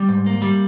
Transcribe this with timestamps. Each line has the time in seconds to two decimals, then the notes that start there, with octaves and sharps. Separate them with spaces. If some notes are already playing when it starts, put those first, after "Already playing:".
Already playing: G3
0.09 G#2
0.26 A#3
0.42 G3